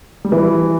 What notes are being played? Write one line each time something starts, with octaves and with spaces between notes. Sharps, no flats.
G3
E3